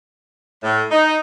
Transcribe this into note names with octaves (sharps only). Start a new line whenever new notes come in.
A2
D#4